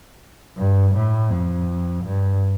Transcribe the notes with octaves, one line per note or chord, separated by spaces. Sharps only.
G2
A2
F2
G2